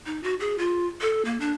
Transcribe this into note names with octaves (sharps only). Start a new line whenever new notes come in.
D#4
F#4
G#4
F4
A4
A#3
D4